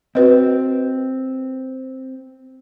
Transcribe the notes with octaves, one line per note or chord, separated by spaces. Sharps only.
C4 F#4 B4 D#5